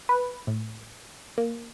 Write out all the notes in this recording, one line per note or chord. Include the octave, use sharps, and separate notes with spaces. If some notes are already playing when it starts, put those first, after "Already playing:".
B4
A2
A#3